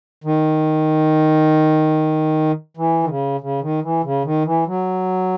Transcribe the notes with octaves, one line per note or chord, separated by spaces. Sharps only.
D#3
E3
D#3
C#3
C#3
D#3
E3
C#3
D#3
E3
F#3